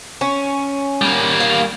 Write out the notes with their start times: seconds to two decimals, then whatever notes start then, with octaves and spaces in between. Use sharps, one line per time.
0.21 C#4
1.02 G3 A#3
1.40 F5